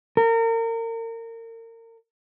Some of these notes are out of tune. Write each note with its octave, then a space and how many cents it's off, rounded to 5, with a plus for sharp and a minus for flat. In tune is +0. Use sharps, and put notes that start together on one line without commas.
A#4 -35